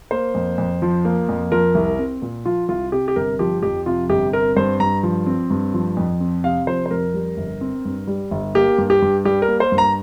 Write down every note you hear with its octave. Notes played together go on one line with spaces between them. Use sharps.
A#3 C5
F2
F2
F3
A#3
F2
F3 A#4
C2
C4
A#2
F3 F4
C2 F4
C3 G4
G4
G1 A#4
F3 G4
F2 G4
C3 F4
G1 G4
C4 A#4
G2 C5
G2 A#5
F3
C4
G2
F3
F2
C4
C3 F5
F3 C5
C5
F2 A#4
G3
G1
C4
G2
G3
G1
A#3 G4
G2
G4
G2
G3 G4
A#4
A#3
C5
G2
A#5